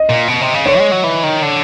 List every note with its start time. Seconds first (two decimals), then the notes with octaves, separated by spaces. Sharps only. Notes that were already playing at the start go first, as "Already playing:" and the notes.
Already playing: D#5
0.09 A#2
0.28 B2
0.41 C3
0.54 C#3
0.66 D3 C#5
0.79 G#3
0.92 F#3
1.04 E3
1.23 D#3
1.43 D3